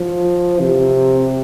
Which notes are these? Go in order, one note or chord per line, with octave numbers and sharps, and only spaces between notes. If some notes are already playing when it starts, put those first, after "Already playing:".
Already playing: F3
C3